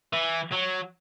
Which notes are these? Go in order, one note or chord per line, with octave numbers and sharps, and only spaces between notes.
E3
F#3